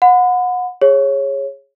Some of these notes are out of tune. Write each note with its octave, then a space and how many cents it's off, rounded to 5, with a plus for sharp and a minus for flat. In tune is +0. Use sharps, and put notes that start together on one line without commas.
F#5 -30 B5 +35
G#4 -15 C#5 -15